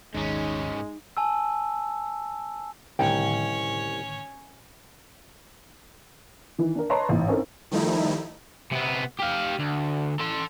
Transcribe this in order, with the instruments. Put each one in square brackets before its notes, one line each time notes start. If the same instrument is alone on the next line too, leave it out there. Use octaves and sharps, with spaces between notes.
[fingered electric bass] D#1 G#1 D#3 [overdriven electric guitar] G#2 C#4 [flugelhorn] G#3 [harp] D#4
[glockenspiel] G#5 A5 E6
[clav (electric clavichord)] C2 [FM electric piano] A2 D3 D#3 [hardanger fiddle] C#4 C#5 [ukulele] G5
[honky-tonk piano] D#3 E3
D4 A#4
B4 C#5 D#5 A5 A#5 C6
A1 G#2
C4 C#4 D#4 A4 A#4
[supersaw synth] D#3 F3 G3 A3 D#4 E4
[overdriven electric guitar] C3 B3
G4 F5
D2
A4 C6